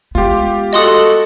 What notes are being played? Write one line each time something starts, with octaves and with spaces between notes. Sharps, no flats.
G#3 B3 F4 G4
F#4 A4 D#5 C6 D#6